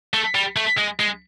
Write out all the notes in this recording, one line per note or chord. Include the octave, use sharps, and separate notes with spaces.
A3
G3
A3
G#3
G#3